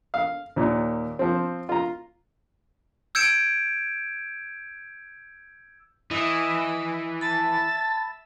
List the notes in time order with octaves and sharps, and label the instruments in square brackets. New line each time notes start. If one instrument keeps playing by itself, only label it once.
[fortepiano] F5
D#2 A#2
F3 C4
F4 A#5
[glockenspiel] E6 G6 G#6 C#7 D7 E7
[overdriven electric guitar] E3 [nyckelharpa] D#5 E5
[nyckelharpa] E5 [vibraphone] A5 B5 [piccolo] A6